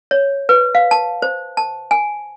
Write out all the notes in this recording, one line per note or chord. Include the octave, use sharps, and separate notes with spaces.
C#5
B4
F5
A5
C5
A5
G#5